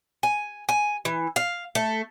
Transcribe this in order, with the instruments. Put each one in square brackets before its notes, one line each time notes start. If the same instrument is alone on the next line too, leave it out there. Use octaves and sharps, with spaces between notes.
[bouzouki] G#5
G#5
E3
F5
A3